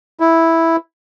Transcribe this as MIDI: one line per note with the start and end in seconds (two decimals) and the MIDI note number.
0.20 0.76 64